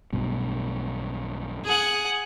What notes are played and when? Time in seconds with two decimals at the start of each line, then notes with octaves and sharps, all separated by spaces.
0.13 B1 G2 B2
1.65 G#4 F#5